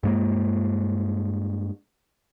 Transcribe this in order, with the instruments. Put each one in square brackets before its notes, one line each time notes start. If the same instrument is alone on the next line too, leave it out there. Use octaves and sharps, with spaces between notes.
[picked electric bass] G2 G#3 A#3